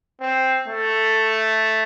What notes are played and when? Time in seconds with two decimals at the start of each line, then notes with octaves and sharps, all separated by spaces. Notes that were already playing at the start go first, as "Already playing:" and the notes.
0.21 C4
0.68 A3